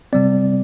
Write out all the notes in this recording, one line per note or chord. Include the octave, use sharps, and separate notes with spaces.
C3 G3 C4 D5